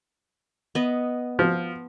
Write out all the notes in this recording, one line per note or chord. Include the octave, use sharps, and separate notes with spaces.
B3 D#5
F3